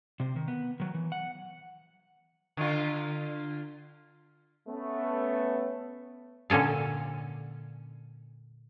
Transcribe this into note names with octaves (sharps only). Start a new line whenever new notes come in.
C3 C4
D#3
B3
D#3 F#3
E3
F#5
D3 F4
A3 B3 C#4
A#2 D3 C#4 A4 F5